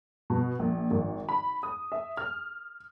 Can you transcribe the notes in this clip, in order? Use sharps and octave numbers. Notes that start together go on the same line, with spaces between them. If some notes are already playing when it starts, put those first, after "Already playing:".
B2
A#1
G#1
B5
D#6
E5
F6